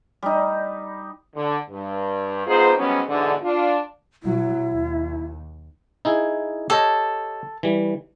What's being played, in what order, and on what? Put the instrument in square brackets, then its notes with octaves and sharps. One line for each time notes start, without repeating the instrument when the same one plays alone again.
[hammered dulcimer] G3 D#4
[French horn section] D3
G2
G#2 B3 D#4 F4 G#4 C5
G#2 F#3 G3 B3 C#4
E2 G#2 B2 D3
D4 F4
[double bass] B2 F#3 [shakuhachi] E4
[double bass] D#2
[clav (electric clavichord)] D#4 E4 G#4
[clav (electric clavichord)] G4 C#5 D#5 [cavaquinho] A4
[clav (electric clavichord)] E3 G3